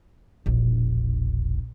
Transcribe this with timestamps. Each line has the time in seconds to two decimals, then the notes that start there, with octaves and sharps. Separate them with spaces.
0.46 E1 A#1